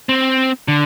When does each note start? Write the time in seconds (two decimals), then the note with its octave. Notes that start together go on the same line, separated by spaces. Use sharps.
0.09 C4
0.68 D3